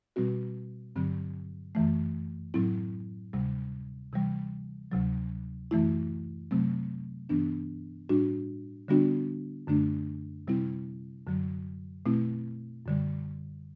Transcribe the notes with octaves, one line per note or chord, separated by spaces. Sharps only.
B2 G3 C4 F#4
G2 D3 F#3 C4
F#2 E3 A3
A2 F#3 C4 E4
D2 C3 G3
C3 E3 G3
D2 C3 F#3
F#2 E3 A3 E4
C3 F#3 A3 C4
G2 E3 B3 D4
A2 G3 D4 F#4
D3 G3 B3 D4 F#4
F#2 D3 A3 D4
C3 G3 C4 E4
F#2 D3 F#3
B2 A3 C4 E4
F#2 D3 G3